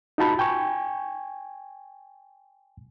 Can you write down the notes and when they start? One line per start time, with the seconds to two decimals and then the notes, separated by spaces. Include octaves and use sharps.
0.18 D#4 F4 F#4 A5 B5
0.39 G5 G#5 C#6